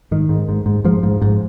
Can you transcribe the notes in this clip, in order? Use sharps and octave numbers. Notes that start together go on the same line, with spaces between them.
G#2 D#3
G#2
G#2
G#2
G#2 F3
G#2
G#2